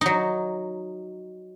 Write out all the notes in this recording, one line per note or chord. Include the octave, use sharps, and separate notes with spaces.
F#3 D#4